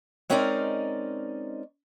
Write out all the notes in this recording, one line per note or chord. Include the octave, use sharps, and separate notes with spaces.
G#3 C4 C#4 D#4 A#4 D5